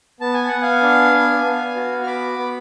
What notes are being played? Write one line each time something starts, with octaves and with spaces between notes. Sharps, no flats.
B3 A5
G#5
B3 F#5
F5 G#5
D4
B3
B3
F#4
F6
B3 B5 D6
B3